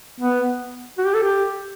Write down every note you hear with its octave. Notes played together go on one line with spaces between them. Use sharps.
B3
F#4
G4
A4
G4